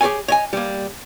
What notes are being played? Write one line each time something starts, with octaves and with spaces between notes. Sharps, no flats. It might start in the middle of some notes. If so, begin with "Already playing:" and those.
G4 G#4 A#4 C#5 G#5
C#5 D#5 G#5
G3 A#3